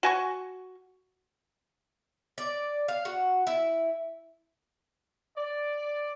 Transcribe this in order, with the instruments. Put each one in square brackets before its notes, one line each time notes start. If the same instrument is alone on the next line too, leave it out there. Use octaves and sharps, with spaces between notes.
[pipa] F#4 G#5 C#6
[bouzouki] D5
F5
F#4
E4
[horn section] D5